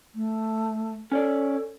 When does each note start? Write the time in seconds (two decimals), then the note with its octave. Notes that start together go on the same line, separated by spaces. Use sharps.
0.15 A3
1.12 C#4 A4 C#5 D5